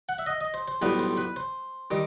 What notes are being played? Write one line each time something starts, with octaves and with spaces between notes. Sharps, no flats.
F#5
E5
D#5
D#5
C5
C5
B1 A2 G3 B3 B4
C5
B4
C5
D#3 G3